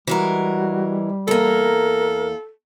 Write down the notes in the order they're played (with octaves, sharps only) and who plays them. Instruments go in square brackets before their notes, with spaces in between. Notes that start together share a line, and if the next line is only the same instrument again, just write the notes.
[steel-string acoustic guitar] E3 G#3 A#4 [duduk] G3 [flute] F#4
[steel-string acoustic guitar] E2 A#3 [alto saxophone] A4 [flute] A#4